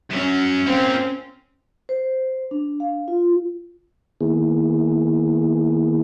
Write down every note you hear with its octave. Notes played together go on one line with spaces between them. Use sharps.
F#2 F#3 C#4
A#3 C4 F4
C5
D4
F5
F4
D#3 A#3 B3 E4 G#4